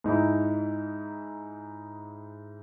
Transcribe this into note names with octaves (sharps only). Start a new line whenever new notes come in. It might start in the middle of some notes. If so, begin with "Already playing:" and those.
G#2 D#4 E4